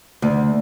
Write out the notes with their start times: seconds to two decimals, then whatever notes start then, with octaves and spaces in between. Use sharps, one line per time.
0.22 D2